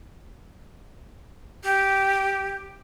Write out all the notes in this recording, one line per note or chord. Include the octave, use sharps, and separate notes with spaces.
G4